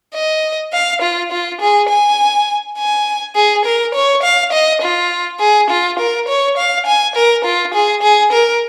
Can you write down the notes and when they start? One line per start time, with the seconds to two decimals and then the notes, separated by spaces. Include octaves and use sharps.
0.14 D#5
0.73 F5
1.02 F4
1.32 F4
1.61 G#4
1.89 G#5
2.78 G#5
3.35 G#4
3.65 A#4
3.95 C#5
4.23 F5
4.52 D#5
4.82 F4
5.40 G#4
5.70 F4
5.98 A#4
6.28 C#5
6.57 F5
6.86 G#5
7.16 A#4
7.45 F4
7.74 G#4
8.02 G#4
8.32 A#4